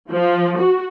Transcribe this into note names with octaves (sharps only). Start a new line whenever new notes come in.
F3
F#4